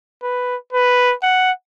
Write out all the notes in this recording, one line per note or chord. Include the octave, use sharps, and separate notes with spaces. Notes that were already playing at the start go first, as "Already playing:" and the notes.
B4
B4
F#5